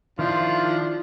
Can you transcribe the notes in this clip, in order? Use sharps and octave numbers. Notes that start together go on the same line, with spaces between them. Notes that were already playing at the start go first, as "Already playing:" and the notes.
D#3 F3 D4 E4 F4